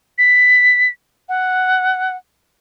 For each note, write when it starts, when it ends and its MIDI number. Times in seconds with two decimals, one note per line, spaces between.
0.18 0.89 95
1.29 2.16 78